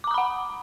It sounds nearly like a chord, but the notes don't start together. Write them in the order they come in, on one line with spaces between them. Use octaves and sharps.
D6 A#5 D#6 B5 F#5